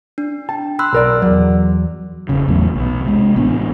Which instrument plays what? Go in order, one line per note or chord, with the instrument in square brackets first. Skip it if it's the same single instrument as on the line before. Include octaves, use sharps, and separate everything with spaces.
[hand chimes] D4
[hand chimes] G5 [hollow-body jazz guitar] A5
[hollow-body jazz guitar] B5 [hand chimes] C6 E6 F#6
[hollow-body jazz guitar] B1 A#4 D5
[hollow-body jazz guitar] E2 F#3 [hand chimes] D5
[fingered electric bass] F1 C#3
A1 E2 F#3 A3
B1 B2
C3 G#3
A1 B3 D4